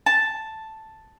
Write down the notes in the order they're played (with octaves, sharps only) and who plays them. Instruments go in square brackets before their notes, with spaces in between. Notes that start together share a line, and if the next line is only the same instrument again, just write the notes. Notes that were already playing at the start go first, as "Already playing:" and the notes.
[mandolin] A5